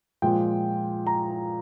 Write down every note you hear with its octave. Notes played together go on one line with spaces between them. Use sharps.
A#2 F3 G#3 G5
A#5